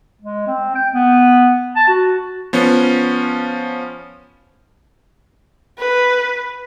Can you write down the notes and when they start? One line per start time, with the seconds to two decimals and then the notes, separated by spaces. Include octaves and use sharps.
0.22 G#3
0.47 C4
0.75 G5
0.93 B3
1.76 A5
1.88 F#4
2.53 F3 B3 C#4
5.78 B4